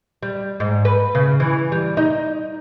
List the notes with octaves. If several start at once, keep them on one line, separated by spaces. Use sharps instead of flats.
G3
G#2
B4
C#3
E3
G3
D#4